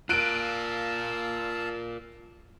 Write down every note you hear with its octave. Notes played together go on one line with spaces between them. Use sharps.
F4 A#4 F5 A5 E6 F#6 D7 D#7